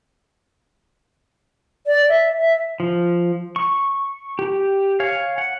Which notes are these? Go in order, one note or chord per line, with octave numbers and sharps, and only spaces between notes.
D5
E5
E5
F3
C#6
G4
C#5 F5 G#5
F#5